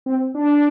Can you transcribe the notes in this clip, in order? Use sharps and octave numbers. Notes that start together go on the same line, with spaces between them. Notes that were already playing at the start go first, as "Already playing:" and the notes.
C4
D4
D4